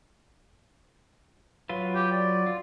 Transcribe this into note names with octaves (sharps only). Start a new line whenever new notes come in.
F#3 F4 B4
G4
D5
F4